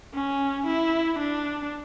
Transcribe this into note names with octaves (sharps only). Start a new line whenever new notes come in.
C#4
E4
D4